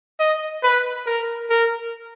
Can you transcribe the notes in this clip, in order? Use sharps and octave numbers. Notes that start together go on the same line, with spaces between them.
D#5
B4
A#4
A#4